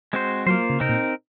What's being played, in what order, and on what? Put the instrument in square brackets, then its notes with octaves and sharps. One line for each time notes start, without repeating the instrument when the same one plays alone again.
[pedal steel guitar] G#3 C4 F#4 C5
[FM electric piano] F#3 [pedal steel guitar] A#3 F4 C5
[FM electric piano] C#3
[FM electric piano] C3 [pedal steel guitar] C4 D#4 A#4
[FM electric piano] A#2